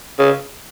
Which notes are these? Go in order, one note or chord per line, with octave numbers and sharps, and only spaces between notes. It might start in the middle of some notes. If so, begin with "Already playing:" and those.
C#3